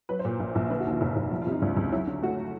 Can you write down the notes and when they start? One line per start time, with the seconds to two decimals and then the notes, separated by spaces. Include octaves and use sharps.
0.09 F#3 B4
0.19 C5
0.25 A#2
0.40 A#1
0.55 A#1
0.70 D3 B4
0.80 F#4
0.85 D#2
0.91 F4
1.01 F1
1.16 F1
1.31 F3 E4
1.42 F4
1.47 C3
1.52 D#4
1.62 C#2 D4
1.77 C#2
1.92 F#3 E4
2.07 D3
2.22 A3 F#4